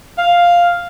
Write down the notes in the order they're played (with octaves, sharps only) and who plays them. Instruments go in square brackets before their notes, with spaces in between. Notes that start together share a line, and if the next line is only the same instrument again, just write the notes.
[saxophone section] F5